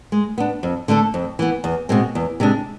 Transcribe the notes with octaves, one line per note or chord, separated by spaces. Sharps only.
G#3
B3 D4
F2
D3 A3 D4 A4
F2
E3 B3
E2
B2 G#3 C4
E2
C3 G#3 D4